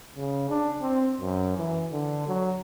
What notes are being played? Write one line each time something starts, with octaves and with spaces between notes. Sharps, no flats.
C#3
D4
C4
F#2
E3
D3
F#3